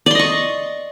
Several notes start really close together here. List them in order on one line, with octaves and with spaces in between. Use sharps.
D5 C6 D#5 C#6